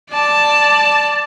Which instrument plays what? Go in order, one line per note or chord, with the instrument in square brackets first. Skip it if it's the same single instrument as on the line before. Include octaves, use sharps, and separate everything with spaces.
[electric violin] D5 A5